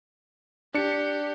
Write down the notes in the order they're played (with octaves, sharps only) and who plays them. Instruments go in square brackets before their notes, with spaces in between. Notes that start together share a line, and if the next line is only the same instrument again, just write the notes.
[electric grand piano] D4 C#7 [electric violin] G4